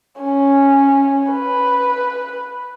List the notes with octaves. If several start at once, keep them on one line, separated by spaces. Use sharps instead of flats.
C#4
B4